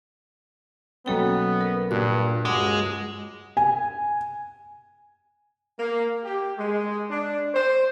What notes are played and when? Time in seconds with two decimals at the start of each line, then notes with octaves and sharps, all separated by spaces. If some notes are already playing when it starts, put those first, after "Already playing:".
1.06 B1 A#3 B3 C#4 A4 G5
1.61 A#4
1.91 G2 A#2 F#6
2.45 C#2 G2 G#3 F#4 G#5 D6
3.57 G#5
5.79 A#3
6.24 G4
6.57 G#3
7.10 D4
7.54 C5